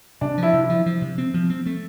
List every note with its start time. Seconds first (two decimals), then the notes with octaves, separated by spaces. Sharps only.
0.21 C3 D4
0.38 F3 E4
0.53 C3
0.64 E4
0.70 F3
0.86 F3
1.01 C3
1.18 C4
1.34 F3
1.50 C4
1.66 A3